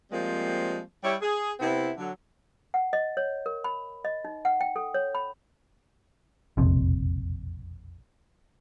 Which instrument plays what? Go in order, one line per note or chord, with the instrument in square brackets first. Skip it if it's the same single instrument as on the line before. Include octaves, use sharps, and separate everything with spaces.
[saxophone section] F3 G3 G#3 A#3 C4
G3 E4 G4 C#5
G#4
C3 B3 C4 E4
D3 F#3
[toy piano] F#5
D#5
C#5
A#4
B5
D#5
D#4
F#5
G5
A4
C#5
B5
[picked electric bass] E1 A#1 F2 C3